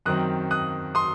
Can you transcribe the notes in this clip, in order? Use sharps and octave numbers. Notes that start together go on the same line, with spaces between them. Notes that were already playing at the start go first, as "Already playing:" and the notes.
F#2 D#3 F#3 C4 D#6 F#6
D#6 F#6
C6 D#6